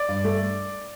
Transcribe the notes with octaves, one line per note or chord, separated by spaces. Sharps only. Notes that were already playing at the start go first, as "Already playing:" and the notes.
Already playing: D5
G2
A3